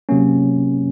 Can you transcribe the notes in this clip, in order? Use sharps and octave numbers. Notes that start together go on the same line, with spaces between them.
C3 F#3 A#3 C#4